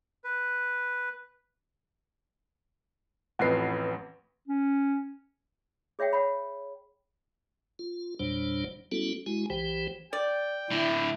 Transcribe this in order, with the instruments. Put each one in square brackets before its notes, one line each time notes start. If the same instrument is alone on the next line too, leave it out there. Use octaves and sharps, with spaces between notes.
[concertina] B4
[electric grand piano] A1 F2 C7 [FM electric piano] B4 F#5
[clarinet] C#4
[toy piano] G#4 C#5 E5 F#5 G5
C#5 F#5 B5
[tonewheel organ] F4
F#1 E2 A#2 G3 D4 C5
G3 B3 C#4 E4 F#4 A4
G#3 E4 F#4 G#5
B1 E3 G4 C5 G5
[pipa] D5 [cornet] G5
[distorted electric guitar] A2 D3 [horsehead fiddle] E4